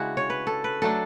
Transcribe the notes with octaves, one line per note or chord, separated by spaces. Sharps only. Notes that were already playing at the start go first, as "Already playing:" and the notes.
Already playing: C#3 G#3 D4 E4 F#4
C#5
B4
A4
B4
F#3 A3 D4 A4